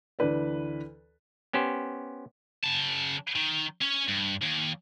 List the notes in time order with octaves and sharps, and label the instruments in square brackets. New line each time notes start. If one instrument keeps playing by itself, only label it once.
[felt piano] D2 E3 B4 D5
[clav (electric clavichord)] B3 C#4 G4 C5
[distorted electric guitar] C#3 A5
D#3
C#4 C#5
G2
D#2